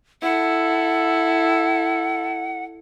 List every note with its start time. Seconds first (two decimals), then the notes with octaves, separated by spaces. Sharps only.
0.22 E4 A4 F#5